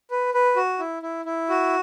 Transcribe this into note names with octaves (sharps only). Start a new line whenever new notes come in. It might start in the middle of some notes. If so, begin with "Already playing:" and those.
B4
B4
F#4
E4
E4
E4
F#4